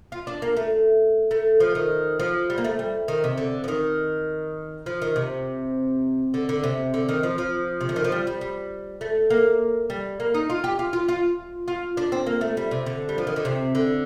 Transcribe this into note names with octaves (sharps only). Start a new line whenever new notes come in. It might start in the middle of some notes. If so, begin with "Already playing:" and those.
F4
D4
A#3
A3
A3
F3
D#3
F3
G3
A#3
A3
G3
D#3
C3
D3
F3
D#3
F3
D#3
C3
D3
D3
C3
D3
D#3
F3
F3
C3
D3
D#3
F3
G3
G3
G3
A3
A#3
G3
A#3
D#4
F4
G4
F4
F4
F4
F4
D4
C4
A#3
A3
G3
C3
D3
G3
F3
D#3
D3
C3
D3